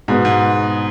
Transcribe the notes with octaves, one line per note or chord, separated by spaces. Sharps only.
G#2 B2 G#3 B3
G#2